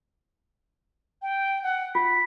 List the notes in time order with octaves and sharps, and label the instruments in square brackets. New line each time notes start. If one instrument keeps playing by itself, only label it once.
[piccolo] G5
F#5
[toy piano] F4 [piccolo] B6